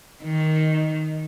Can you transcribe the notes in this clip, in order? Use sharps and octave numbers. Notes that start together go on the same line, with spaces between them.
D#3